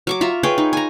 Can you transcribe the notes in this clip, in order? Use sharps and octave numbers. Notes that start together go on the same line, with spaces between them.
F#3 C#6 D6
F4 E5 A#5
G#4 B4 C#5 G5
D#4
G#5 A#5